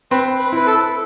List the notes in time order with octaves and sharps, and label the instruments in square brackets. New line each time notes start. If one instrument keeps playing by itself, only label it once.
[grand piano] C4 [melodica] B4
[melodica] B4
[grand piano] E4 [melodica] B4
[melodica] A4